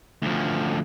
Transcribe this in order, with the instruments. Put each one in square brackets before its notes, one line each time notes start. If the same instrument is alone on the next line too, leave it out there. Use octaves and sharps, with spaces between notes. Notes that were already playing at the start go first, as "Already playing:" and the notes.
[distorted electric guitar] D2 F3